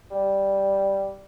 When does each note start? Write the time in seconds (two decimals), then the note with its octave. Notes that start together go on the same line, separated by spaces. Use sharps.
0.11 G3